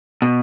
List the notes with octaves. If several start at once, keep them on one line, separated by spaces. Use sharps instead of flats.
B2